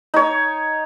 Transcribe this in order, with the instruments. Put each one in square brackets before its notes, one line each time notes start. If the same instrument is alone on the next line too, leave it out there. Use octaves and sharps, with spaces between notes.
[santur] D#4 C#5